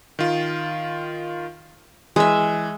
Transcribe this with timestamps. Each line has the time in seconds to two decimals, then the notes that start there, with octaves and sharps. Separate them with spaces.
0.19 D#3 F4
2.16 E3 G#3 E5